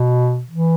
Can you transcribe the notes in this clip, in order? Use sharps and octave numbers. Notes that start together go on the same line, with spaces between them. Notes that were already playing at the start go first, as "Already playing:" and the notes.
Already playing: B2
E3